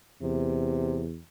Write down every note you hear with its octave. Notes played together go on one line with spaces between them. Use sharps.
E2 C3